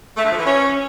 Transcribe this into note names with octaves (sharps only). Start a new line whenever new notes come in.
A3
D3
F3
E3
C#4